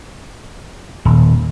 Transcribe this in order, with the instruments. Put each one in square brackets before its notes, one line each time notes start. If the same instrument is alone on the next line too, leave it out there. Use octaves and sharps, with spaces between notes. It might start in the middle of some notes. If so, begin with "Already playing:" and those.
[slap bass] D#1